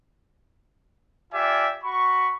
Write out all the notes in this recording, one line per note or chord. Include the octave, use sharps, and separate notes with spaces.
F4 G4 D5 E5 G#5
F#4 B5 C#6